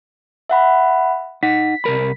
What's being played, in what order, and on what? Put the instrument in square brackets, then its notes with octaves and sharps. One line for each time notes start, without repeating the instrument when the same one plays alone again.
[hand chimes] E5 F#5 B5
[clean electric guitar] D#4 F#5 [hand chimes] B6
[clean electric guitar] C2 A#4 B5